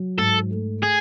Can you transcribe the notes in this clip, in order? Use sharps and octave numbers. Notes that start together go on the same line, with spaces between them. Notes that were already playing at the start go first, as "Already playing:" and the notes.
Already playing: F#3
G#2 A4
A3
G#4